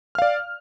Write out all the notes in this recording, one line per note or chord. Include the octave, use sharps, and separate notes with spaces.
D5 F5 F6